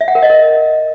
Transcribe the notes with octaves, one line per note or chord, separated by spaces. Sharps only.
E5
F#5
A#4
D#5
A#4